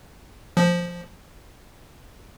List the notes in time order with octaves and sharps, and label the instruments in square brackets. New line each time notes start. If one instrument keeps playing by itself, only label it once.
[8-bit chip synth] F3